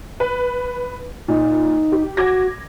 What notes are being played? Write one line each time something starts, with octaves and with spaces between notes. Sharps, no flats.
B4
A#2 D#4
G4
F#4 D6 G#6 A#6